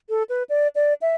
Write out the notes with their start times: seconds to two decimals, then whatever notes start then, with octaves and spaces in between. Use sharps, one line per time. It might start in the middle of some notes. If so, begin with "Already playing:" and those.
0.09 A4
0.29 B4
0.49 D5
0.75 D5
1.02 E5